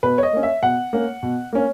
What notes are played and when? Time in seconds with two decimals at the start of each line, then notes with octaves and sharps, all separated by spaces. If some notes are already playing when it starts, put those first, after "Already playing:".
0.03 B2 B4
0.18 C#5
0.23 D#5
0.33 A#3 C#4
0.43 E5
0.63 B2 F#5
0.93 A#3 C#4
1.23 B2
1.53 A#3 C#4